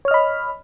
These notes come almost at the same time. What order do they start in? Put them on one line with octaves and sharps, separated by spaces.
C#5 F6 D#5 B5